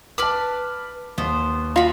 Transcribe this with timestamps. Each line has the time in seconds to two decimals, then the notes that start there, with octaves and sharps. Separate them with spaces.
0.18 B4 A5 B5 D6 F6
1.18 D#2 B3 C5
1.76 F4 F#4 B5